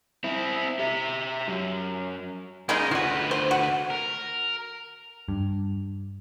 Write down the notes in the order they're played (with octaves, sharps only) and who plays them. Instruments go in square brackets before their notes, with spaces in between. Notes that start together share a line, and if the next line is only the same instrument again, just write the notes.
[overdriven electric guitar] C4 E4
G4 E5
F#2
[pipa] C#3 G#3 D#4 [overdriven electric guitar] A#3 G#4
[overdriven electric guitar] D2 B4 [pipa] F4 F#4
[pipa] C5
F#4
[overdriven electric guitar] A#4
[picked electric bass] G2